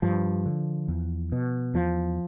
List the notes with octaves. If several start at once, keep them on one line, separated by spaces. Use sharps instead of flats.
G2 F3
D3
E2
B2
E2 F3